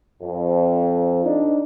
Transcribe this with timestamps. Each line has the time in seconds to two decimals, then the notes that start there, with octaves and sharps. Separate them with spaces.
0.22 F2
1.24 D4 D#4